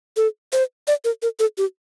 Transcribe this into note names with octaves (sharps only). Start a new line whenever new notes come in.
A4
C5
D5
A#4
A#4
A4
G4